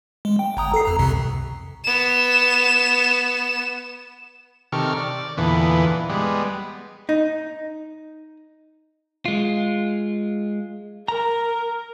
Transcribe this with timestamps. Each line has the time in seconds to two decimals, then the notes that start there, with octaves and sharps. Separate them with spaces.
0.25 G#3
0.39 G5
0.57 G1 A#5 D#6
0.74 A4 C7
0.85 F2 A#5
0.99 C2 F2 C3
1.84 B3 E7
4.72 C3 D#3 G4 A4 C#6 F6
4.97 D5
5.38 E2 A#2 D3 E3 B3
6.09 G3 G#3 B3
7.09 D#4
9.26 G#3 F4
11.08 A#4 A#5